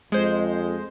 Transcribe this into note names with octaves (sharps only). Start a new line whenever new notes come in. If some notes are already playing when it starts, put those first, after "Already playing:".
F2 G#3 C5